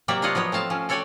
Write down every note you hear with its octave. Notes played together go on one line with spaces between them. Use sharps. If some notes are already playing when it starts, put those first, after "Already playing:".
C3 F#3 A#3 G4 D5 E5
D4 F4 C#5 D#5 F5 F#5
F3 F#3 B3 C#5
A3 C4 F5 A5
F3 C#4
F#4 A4 C#5 D5 G5 G#5